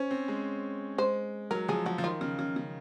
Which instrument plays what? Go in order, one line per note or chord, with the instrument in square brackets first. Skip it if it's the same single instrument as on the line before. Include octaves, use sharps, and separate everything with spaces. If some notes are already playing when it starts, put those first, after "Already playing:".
Already playing: [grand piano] C#4 [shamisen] C5
[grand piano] C4
G#3
[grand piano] G#3 [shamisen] C5
[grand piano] F#3 [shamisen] A#4
[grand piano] F3 [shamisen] G#4
[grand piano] F3 [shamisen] F#4
[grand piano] F3
[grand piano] D#3 [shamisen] F4
[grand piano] C#3
C#3
C#3